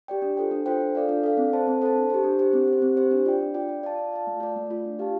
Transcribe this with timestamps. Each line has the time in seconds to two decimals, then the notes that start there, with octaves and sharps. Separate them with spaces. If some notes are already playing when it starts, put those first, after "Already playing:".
0.08 G4 D5 G5
0.22 D4
0.37 F4 A4 C5 G5
0.51 D4
0.66 F4 A4 C5 G5
0.81 D4
0.95 A4 D5 F5
1.09 D4
1.24 A4 D5 F5
1.37 C4
1.53 A4 C5 A5
1.67 C4
1.82 A4 C5 A5
1.96 D4
2.10 G4 C5
2.24 D4
2.39 G4 C5
2.53 C4
2.68 G4
2.73 C5
2.82 C4
2.97 G4 C5
3.11 D4
3.26 F4 D5 G5
3.41 D4
3.54 F4 D5 G5
3.69 F4
3.83 D5 F5 A5
3.98 F4
4.12 D5 F5 A5
4.27 A3
4.40 F4 D5
4.56 A3
4.70 F4 D5
4.85 D4
4.99 G4 F5 A5